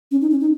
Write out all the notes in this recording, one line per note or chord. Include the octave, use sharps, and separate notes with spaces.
C#4
D#4
C#4
D#4